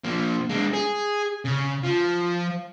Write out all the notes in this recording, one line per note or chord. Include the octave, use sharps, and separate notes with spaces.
A#2 F3
G#3 D4
G#4
C#3
F3